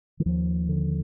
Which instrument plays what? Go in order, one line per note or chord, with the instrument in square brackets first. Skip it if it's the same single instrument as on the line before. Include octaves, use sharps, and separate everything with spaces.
[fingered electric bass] D#3
D#2 F3
D3